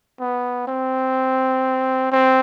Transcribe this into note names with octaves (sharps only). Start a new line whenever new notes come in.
B3
C4
C4